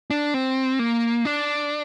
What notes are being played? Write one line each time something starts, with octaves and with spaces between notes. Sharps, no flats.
D4
C4
A#3
D4